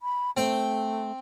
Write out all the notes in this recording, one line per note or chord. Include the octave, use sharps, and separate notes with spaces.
B5
A3 C4 G5